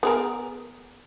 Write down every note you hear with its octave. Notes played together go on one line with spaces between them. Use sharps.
B3 G#4 A#4